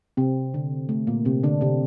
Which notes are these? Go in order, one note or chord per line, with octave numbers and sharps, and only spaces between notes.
C3 C4
D3
A3
A#2 A#3
C3 C4
D3 D4
C3 C4